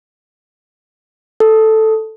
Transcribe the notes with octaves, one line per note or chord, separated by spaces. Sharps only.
A4